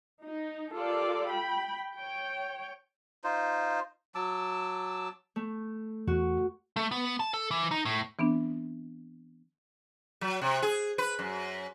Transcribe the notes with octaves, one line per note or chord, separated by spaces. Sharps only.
D#4
F4 G4 A4 A#4 D5
G5 B5
C#5 G5
D#4 F4 C5
F#3 A5 D6 E6
A3
E2 F#4
A3
B3
A5
A4
E3
D#4
A2
E3 B3 C4 D4
F#3
C3
G#4
B4
F#2